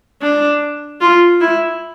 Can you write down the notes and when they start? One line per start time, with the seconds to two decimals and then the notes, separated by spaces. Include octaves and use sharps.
0.22 D4
1.01 F4
1.41 E4